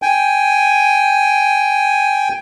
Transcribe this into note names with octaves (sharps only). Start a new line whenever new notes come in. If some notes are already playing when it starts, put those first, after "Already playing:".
G5 G#5